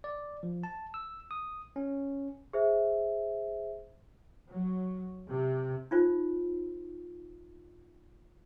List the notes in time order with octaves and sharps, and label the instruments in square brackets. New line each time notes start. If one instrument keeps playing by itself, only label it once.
[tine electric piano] D5
F3
A5
E6
D#6
C#4
[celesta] G#4 C5 E5
[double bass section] F#3
C3
[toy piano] D#4 F4 C5